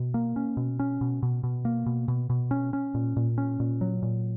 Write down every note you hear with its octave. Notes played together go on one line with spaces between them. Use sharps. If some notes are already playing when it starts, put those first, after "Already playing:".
Already playing: B2
A#3
C#4
B2
C#4
B2
B2
B2
A#3
B2
B2
B2
C#4
C#4
A#2
A#2
C#4
A#2
F#3
A#2